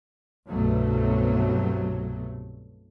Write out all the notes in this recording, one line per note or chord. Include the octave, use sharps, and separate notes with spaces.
C2 G2 B2 F#3 A3